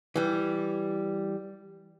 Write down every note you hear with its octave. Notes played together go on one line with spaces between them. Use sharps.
E3 G3